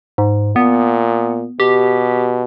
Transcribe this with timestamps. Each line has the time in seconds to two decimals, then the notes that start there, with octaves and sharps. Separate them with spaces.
0.18 G#2
0.56 A#2 B3
1.60 B2 G4